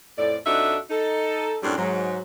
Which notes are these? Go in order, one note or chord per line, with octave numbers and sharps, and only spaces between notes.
F2 A2 D5
F2 D4 D#4 F#4 A4 E5
D#4 A4
F#2 A2 G3 C4 D4
G#2 F#3